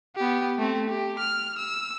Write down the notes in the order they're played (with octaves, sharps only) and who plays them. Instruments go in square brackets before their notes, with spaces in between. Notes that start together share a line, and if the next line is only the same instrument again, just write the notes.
[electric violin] B3 G4
A3 C4
G4
F6
E6